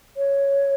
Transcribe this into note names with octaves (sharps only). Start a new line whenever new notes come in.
C#5